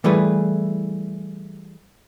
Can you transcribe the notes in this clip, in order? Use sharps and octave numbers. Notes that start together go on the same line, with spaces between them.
E3 G3 A3 E4 G#4 B4